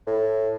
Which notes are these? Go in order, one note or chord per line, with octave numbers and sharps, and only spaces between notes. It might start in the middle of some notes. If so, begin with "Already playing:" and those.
A2